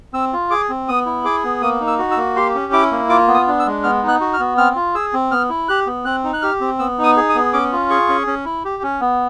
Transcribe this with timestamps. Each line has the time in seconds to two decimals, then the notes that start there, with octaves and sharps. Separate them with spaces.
0.14 C4 E6
0.33 F4
0.50 G#4 D6
0.69 C4
0.88 B3 D#6
1.06 E4
1.24 G#4 D6
1.44 B3
1.61 A#3 D#6
1.80 D#4
1.87 E6
1.99 F#4
2.11 E6
2.17 A#3
2.36 G4 C6
2.55 C#4
2.73 E4 D6
2.91 A#3
3.09 F4 D6
3.28 B3
3.34 D#6
3.47 D4
3.60 E6
3.66 G#3
3.84 B3 F6
4.03 D#4
4.08 F#6
4.21 F#4
4.33 F6
4.40 B3
4.57 C4 F6
4.76 F4
4.95 G#4 E6
5.14 C4
5.31 B3 F6
5.50 E4
5.69 G4 F#6
5.87 B3
6.05 C4 F#6
6.24 D#4
6.33 F#6
6.42 G4 F6
6.61 C4
6.79 B3 E6
6.99 D#4 D#6
7.17 G#4
7.29 D#6
7.35 B3
7.53 C#4 D6
7.72 F4
7.90 G#4 C#6
8.09 C#4
8.27 C#4
8.45 E4
8.65 G4
8.83 C#4
9.01 B3